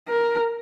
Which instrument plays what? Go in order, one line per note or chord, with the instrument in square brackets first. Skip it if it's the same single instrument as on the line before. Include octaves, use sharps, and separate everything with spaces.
[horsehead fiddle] A#4